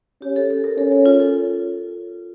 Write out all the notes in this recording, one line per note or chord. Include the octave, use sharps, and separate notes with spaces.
C#4 G4
A4
A4
A#4
C#4 A4
A4
F4
A4